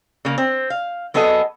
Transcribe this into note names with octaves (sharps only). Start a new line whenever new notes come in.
C#3 A#3
C4
F5
F#3 B3 G#4 A4 D#5